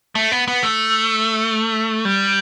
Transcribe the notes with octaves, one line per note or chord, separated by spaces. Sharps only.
A3
B3
B3
A3
G3